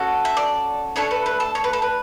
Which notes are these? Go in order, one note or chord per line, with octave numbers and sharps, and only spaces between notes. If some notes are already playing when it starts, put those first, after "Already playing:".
Already playing: C#4 F#4 A4
E5
D5
A3 D4 A4 C#5
B4
B4
A4
C#5
B4
A4
B4